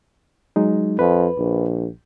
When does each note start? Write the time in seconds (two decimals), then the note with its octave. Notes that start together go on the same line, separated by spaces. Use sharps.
0.56 F#3 G#3 D#4
0.99 F2 B4
1.38 A#1